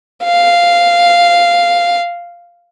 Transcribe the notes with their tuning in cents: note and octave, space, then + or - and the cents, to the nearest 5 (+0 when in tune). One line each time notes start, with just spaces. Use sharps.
F5 -5